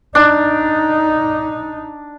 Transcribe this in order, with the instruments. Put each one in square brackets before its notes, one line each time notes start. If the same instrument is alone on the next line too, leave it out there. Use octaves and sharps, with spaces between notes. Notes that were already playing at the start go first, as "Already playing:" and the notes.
[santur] D4 [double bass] D#4